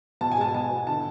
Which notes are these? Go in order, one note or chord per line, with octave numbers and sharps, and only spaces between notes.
B2 A5
G#5
G#3 A5
B2 A5
B3
D3 A5